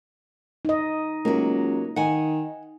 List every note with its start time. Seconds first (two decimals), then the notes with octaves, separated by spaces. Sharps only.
0.65 D#4 D#5
1.25 C#2 F#3 A#3
1.96 D#3 F#5 G#5